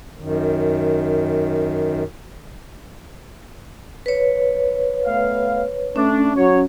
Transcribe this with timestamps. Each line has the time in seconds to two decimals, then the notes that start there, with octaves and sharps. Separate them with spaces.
0.18 F#2 D#3
4.06 B4 C#5
5.06 A3 B3 F5
5.96 A3 C#4 D4
6.35 F#3 F#4 C#5